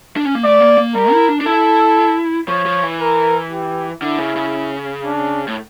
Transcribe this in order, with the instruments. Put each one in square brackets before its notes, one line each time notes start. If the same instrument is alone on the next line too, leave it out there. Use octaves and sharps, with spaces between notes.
[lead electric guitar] D4
C#4
A#3
[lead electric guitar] A3 [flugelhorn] D5
[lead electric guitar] A#3
A#3
[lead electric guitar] G3 [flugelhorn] A#4
[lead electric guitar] E4
D4
D4
[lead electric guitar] E4 [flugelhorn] A4
[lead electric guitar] F3 [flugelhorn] C#5
[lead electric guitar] F3
E3
[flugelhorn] A#4
G4
[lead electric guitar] D3 [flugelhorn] E4
[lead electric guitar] C#3
C#3
[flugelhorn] D4
[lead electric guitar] A2